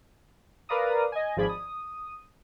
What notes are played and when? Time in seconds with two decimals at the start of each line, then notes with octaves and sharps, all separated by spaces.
0.69 A#4 B4 D5 F5 A#5 D#6
1.12 D#5 G#5
1.37 G#1 F3 G#4 D5 B5 G#6
1.49 D#6